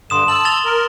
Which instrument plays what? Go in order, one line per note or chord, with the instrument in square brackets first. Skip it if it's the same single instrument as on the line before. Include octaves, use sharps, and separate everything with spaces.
[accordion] G2 D3 [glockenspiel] C6 D#6 E7
[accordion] A5 E6 [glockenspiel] F#7
[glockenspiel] A6 F7 G7
[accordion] A#4